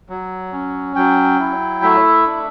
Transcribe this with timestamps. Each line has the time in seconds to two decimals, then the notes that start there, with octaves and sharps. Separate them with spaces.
0.09 F#3
0.52 C#4
0.96 F#3 G5
1.39 E4
1.82 A3 E5
2.26 D4